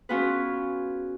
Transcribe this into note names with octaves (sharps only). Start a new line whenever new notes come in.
B3 C#4 F4 F#4 G#4 B4